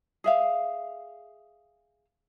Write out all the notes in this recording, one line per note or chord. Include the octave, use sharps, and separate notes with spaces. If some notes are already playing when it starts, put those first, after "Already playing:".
G#4 E5 F5